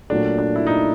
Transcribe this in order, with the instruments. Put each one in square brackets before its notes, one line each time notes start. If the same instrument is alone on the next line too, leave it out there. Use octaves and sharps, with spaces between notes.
[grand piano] A#2 F#3 A3 [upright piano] D4
[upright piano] D4
E4
D#4